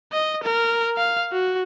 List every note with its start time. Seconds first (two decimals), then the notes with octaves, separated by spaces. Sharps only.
0.13 D#5
0.44 A#4
0.97 F5
1.32 F#4